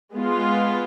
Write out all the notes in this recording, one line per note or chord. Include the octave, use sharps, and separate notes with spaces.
G#3 B3 F4